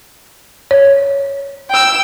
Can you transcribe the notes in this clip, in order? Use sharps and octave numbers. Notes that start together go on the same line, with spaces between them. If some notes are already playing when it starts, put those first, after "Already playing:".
C#5
G5 E6